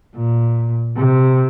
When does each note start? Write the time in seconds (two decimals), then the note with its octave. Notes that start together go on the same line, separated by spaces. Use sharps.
0.16 A#2
0.97 C3